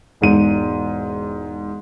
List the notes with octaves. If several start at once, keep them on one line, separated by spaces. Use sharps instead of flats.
E1 G#2 D#7